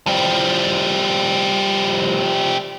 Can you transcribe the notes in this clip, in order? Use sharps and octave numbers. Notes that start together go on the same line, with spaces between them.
F3 G3